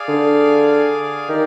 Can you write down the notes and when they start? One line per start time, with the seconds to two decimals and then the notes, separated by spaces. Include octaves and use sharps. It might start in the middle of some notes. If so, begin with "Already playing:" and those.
Already playing: G#4 D5 F5 G#5
0.08 D3
1.28 D#3 G4 A#4 D5